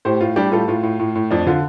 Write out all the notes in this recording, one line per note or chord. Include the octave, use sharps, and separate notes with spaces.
A2 G4 C5
A2 F4
G3 D4 G4
A2 F4 A4
A2 F4
A2
A2
A2
F2 D4
D3 F4